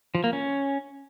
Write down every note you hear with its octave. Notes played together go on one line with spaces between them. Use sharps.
F3
A#3
C#4